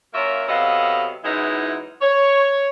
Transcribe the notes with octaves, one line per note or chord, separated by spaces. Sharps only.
A#3 C#4 F4 F#4 A#4 E5
C3 F#3 B3 A4 D#5 F5
F#2 E3 G#3 B3 D#4 E4
C#5